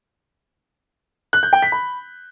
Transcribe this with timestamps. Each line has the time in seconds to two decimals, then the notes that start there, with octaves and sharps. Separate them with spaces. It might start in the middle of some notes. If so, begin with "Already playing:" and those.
1.33 F#6
1.43 G6
1.53 G5
1.62 B6
1.72 B5